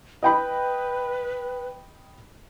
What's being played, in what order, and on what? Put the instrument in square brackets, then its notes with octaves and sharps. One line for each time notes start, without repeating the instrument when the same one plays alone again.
[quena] B4 [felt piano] D#5 G5 B5